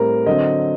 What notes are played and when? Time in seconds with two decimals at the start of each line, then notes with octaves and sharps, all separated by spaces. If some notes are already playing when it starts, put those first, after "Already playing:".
Already playing: A2 G3 C4 A#4
0.26 D3 F#3 C4 D#5